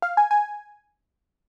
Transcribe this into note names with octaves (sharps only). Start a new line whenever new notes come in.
F5
G#5
G#5